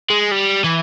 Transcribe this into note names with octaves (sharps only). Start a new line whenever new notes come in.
G#3
G3
E3